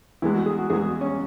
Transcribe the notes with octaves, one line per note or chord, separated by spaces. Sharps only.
E2 E3 G#3 B3 E4
F#4
G#4
F#4
E2 E3 G#3 B3 G#4
F#4
C#4